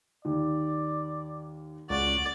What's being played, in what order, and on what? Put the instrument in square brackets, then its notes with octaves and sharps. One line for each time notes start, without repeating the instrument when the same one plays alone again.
[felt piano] D#2 [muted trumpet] D5
[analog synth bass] C#2 [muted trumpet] F#4 [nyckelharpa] D5